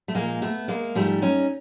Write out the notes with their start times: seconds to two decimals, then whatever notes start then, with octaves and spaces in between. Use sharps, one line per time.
0.08 A3
0.15 A#2 F3 G#3 A#3
0.42 A3 B3
0.68 G#3 A#3
0.95 G#2 F3 G3 A3
1.22 C#4 D#4